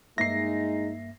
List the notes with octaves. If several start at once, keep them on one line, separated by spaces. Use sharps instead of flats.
G2 G#3 A#3 D#4 E5 A#6 C7